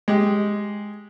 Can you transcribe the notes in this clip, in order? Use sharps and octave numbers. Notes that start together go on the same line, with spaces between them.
G#3 G4